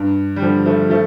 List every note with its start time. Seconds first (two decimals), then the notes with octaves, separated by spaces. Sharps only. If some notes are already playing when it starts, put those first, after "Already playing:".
Already playing: G2
0.36 G3
0.42 D3 F3
0.66 F3 A3
0.90 F3 A3